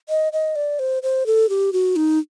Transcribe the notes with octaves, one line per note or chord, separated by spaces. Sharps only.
D#5
D#5
D5
C5
C5
A4
G4
F#4
D#4